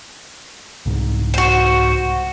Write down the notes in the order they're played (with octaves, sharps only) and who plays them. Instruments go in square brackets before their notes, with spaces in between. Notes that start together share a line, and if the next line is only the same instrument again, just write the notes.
[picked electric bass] C2 G#2
[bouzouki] F#4 C5